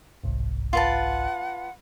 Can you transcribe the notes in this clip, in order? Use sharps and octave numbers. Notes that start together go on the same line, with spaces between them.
G1 C2 G#2
F4 B4 F#5 A5